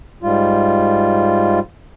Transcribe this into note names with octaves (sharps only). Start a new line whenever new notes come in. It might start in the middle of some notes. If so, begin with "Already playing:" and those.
G#2 G3 F4